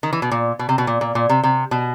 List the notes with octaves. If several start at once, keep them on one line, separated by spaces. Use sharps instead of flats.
D#3
E3
B2
A#2
B2
C3
B2
A#2
A#2
A#2
C3
C3
B2